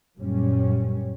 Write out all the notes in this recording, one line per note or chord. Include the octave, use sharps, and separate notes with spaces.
F#2 A#2 G3 C#4